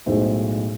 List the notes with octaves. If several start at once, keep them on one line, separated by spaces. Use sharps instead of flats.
B1 A2 G#3 C5